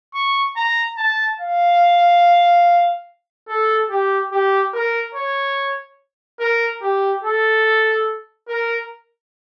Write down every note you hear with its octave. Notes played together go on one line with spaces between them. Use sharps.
C#6
A#5
A5
F5
A4
G4
G4
A#4
C#5
A#4
G4
A4
A#4